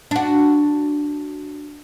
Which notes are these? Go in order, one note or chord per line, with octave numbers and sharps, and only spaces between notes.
D4 F#4